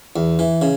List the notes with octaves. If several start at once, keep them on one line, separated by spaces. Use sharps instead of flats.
E2
E3
C#3